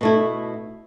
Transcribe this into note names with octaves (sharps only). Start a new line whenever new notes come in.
B2 A3 E4